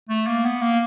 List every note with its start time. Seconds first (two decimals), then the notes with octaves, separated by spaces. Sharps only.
0.10 A3
0.27 A#3
0.45 B3
0.62 A#3